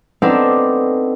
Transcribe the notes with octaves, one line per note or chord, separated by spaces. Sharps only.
B3 C4 D4 D#4 A4